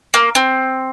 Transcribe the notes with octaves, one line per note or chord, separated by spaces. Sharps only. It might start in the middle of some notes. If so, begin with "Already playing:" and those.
A#3
C4